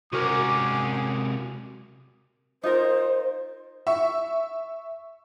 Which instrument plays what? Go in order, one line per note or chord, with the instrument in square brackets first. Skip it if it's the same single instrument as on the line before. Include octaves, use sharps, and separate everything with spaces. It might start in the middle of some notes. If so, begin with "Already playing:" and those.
[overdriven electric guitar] C3 G#3 [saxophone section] C#4 D#4 G#4 [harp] F#4 A#4 [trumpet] D6
[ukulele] D#4 F4 A#4 [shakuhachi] C5
[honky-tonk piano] E5 C#6